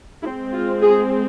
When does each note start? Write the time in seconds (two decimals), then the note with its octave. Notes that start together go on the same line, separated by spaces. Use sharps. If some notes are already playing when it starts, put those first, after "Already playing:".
0.23 G#3 C4 E4
0.53 F4
0.82 G#4